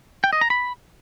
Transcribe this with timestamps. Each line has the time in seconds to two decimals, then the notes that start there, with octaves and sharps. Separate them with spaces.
0.24 G5
0.33 D#5
0.41 A#5
0.50 B5